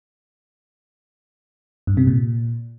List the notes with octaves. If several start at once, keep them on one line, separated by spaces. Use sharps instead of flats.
G2
C3
A#2